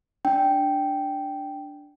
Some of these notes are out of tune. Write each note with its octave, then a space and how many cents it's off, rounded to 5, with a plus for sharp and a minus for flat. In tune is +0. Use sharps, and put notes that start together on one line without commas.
D4 +0 G5 -5